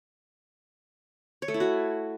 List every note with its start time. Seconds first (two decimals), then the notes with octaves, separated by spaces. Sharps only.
1.42 C#5
1.48 A3
1.54 E4
1.60 F#4